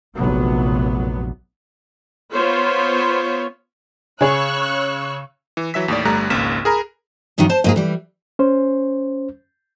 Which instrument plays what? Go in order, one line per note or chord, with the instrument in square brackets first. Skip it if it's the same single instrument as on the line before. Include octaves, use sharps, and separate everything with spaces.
[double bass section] F1 A#1 C3 F#3 B3
[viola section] B3 F4 C5 C#5 B5
[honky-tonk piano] C#3 C#5 [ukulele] G#4 [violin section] C#6 E6 F#6
[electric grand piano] E3
E3 F#3 E5 E6 B6
D#2 A2 D5
G1 G3 A3 A#5 F#6
G#1 C#2 A#3 F6 B6 E7
G#4 A#4 A#5 B5
[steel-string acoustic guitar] E2 G2 D#3 F#3 D#4
C5 A5
G#2 A#3 G#4
E3 G3
[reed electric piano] C#4 C5